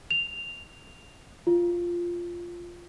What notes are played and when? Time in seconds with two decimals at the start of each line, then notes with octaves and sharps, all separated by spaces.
0.11 F7
1.47 F4